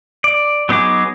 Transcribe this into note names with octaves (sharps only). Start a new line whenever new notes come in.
D5
F#3 B3 D#4 G#4 D6